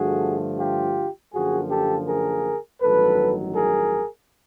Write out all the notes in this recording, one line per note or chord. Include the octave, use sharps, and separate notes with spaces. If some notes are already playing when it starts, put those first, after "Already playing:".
Already playing: G2 D3 F3 A3 F#4 G#4
F4 G4
F#2 D3 F3 A#3 F#4 G#4
G4 A4
G#4 A#4
A1 G2 D#3 F#3 A4 B4
G#4 A#4